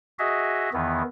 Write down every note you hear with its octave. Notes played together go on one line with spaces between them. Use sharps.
F#4 G#4 D#5 E5
E2 D#3 E3 B3